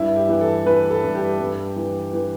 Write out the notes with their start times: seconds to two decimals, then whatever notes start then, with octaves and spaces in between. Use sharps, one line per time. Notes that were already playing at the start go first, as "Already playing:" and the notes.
Already playing: G2 E4
0.17 G4
0.29 E3
0.41 A4
0.66 E3 B4
0.91 A4
1.04 G2
1.15 G4
1.41 G2
1.76 E3
2.14 E3